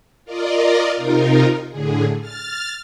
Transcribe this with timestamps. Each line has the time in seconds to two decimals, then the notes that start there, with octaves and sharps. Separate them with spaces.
0.25 F4 A#4 D5 D#5
0.96 C3 D#4 F4 A#4
1.70 A2 D3 G#4
2.20 F6 A6